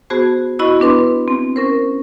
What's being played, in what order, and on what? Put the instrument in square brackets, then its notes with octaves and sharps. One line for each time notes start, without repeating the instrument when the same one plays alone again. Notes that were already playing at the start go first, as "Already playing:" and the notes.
[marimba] B3 F#4 G#4 C5 A5
E4 F#4 D#5 B5 C#6 E6
B3 D4 B4 C6
C4
C#4 A#4 C5